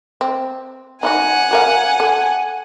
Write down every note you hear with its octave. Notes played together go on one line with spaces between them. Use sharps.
C4
D#4 F4 F#4 F#5 G#5
F#4 A#4 F5
A4